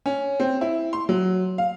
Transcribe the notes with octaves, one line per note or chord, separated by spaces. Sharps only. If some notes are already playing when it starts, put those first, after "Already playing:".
C#4
C4
E4
C6
F#3
F5